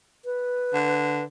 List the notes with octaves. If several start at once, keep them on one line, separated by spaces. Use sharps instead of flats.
B4
D3